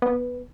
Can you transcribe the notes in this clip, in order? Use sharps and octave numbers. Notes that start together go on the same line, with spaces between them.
B3